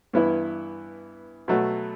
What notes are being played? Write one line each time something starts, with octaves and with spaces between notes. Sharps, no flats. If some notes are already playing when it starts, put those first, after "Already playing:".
G2 E3 B3 E4
B2 F#3 A3